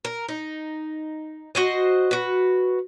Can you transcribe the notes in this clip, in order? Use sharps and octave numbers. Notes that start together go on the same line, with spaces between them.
A#4
D#4
F#4 C5 D#5
F#4 B4